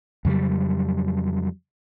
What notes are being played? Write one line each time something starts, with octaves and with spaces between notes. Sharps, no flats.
F2 C#3 F#3 G3